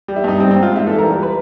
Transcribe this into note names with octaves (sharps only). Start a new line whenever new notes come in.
G3
E4
G2 D#4
G3 C4
C4
G#2
F4
G#2 E4
E3 A4
A#4
G3
A#4
B4